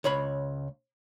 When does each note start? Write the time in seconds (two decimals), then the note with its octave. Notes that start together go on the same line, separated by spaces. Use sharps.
0.04 C#2 C#5 B5